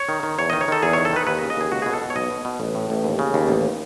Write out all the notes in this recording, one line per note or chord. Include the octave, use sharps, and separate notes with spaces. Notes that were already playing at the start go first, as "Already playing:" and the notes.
Already playing: C#5
D#3
D#3
E2 C#5
D#3 D#5
C#5
D#3 A4
E2 G#4
D#3 C#5
A4
D#3 B4
D#2 B4
D#5
C#3
D#5
D#2 G#4
C#2 F#4
B2 G#4
A4
B2
C#5
B1 D#5
B2
B2
A1
A2
A1
D#2
C#3
D#2
A1